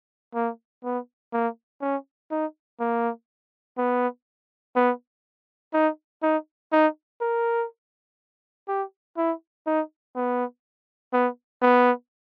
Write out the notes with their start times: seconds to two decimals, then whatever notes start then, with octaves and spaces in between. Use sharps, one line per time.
0.35 A#3
0.84 B3
1.33 A#3
1.81 C#4
2.31 D#4
2.80 A#3
3.78 B3
4.76 B3
5.73 D#4
6.22 D#4
6.72 D#4
7.21 A#4
8.68 G4
9.17 E4
9.66 D#4
10.15 B3
11.13 B3
11.62 B3